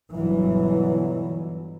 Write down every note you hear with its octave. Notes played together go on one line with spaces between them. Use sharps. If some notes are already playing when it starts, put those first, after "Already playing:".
G1 B2 E3 F#3